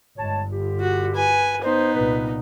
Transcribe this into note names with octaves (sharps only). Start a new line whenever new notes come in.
G1 G2 G#3 C#5 A5
D3 F4 G4
F#4
B4 G#5
B3 D#4 C5
C2 A#2 B4